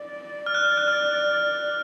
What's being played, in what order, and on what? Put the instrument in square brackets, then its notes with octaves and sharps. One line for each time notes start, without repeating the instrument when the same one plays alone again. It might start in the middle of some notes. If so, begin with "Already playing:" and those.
Already playing: [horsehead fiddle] D5
[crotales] F6
F#6
F6
F#6
F6